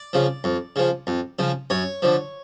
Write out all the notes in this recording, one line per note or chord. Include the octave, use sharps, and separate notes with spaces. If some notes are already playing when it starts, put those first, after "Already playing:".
Already playing: D5
C#3 F3
F2
C#3 F3
F2
C#3 F3
F#2 C#5
D3 F3